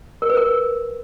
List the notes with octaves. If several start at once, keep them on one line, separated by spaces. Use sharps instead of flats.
A#4
B4
A#4